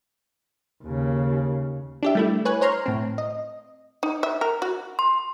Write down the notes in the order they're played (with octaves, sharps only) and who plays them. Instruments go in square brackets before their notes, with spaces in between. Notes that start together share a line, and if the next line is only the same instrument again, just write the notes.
[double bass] D#2 C#3
[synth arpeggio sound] D4 G4 E5
G3 A3 E4
B4 C#5 G#5 F#6
C5 C#5 A#5 C6 F6
A2 C4
D#5
[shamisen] D#4
E5
A#4
F#4
[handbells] C6